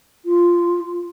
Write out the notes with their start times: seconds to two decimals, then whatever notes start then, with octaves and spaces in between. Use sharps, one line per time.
0.25 F4